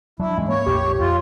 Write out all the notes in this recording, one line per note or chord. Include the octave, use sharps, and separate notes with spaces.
F#3 D4 E4
G#2 E3 G#3 C#4
A#3 C#5
A#1 F2 G4
F2 F4